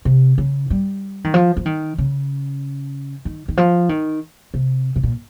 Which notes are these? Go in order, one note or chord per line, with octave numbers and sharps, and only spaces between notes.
C3
C#3
G3
D#3
F3
F3
D#3
C#3
D#3
D#3
F3
D#3
C3
C3
A#2